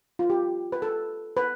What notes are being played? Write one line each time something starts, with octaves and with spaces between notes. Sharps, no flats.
F4
G4
B4
A4
B4